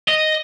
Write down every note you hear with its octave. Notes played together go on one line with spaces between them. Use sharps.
D#5